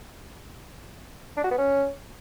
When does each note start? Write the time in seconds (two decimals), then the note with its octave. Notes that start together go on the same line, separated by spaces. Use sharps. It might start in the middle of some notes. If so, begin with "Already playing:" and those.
1.37 D4
1.44 F#4
1.51 B3
1.58 C#4